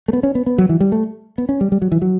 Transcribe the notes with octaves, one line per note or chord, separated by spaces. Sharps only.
A3
B3
C#4
B3
B3
F#3
E3
G3
A3
B3
C#4
G3
G3
F#3
E3
F#3